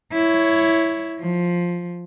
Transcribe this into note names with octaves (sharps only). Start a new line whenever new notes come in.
E4 C#5
F3